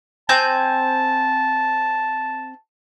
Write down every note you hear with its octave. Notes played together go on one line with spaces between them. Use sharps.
C4 G#5 A5 G6